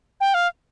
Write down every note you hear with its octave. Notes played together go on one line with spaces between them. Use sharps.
G5
F5